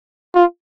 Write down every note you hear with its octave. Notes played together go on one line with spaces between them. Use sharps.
F4